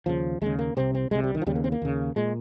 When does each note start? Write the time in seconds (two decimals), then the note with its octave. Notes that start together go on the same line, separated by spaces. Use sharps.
0.06 D#2 C#3 F3
0.41 D#2 C#3 G#3
0.59 A#3
0.77 C2 C3 C4
0.95 C4
1.11 C2 C3 G#3
1.24 G3
1.35 D#3
1.42 F3
1.47 D#2 C#3 G3
1.55 A#3
1.64 C4
1.72 A#3
1.82 D#2 C#3
2.16 A#2 G#3